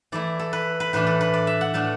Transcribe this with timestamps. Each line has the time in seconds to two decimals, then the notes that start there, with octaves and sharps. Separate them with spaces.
0.12 E3 A3 E4 D5
0.39 A4
0.53 B4
0.80 B4
0.93 A2 E3 D4 B4
1.07 A4
1.21 B4
1.34 D5
1.47 E5
1.61 F#5
1.74 A2 A3 D4 A5